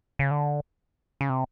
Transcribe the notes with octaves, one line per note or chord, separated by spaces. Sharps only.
C#3
D3
C#3
C3